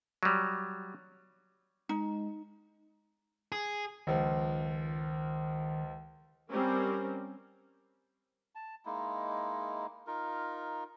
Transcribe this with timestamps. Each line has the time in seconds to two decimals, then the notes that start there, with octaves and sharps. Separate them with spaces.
0.23 F#3 G3
1.89 G#3 D#4
3.52 G#4
4.07 C#2 D#3 F3
6.49 G3 C4 C#4 A#4
8.55 A5
8.86 G#3 A#3 D#4 E4
10.07 D#4 F4 A#4